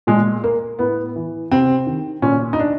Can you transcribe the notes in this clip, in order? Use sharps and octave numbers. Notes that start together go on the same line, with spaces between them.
A#2 G#3
A#3
A2 B3
E3
C3 C4
D#3
A#2 C#4
D#4
D4